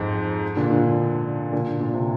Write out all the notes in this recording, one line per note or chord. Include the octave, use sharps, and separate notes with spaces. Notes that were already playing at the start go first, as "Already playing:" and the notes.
Already playing: F2 G#2
A#2 D3
A#2 D3
A#2 D3
A#2 D3
C3